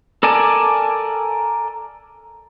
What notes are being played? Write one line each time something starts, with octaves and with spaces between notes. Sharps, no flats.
A4 A#4 D5 G#5 A5